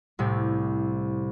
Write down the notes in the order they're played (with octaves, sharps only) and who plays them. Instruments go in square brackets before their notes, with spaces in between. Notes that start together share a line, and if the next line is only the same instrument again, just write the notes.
[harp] C2 A2 C3